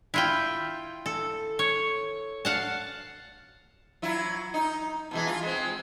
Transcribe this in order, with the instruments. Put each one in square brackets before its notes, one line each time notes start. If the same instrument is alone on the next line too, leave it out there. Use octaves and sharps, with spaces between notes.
[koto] E4 F4 G5
A4
C#5
F5 F#5 A5
[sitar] F#3 E4 F4
D#4
B2 E3 G#3
F4
G#3 C4